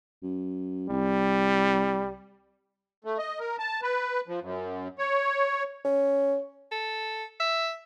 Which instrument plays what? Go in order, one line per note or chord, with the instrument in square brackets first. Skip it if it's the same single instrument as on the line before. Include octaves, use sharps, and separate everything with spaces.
[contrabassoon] F#2
[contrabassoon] C2 [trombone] G3
[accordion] A3
D#5
A#4
A5
B4
F3
F#2
C#5
[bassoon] C#4
[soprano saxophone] A4
E5